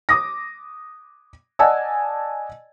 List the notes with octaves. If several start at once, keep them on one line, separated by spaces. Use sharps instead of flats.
D6 D#6 A#6
D5 D#5 F#5 G#5 A5 E6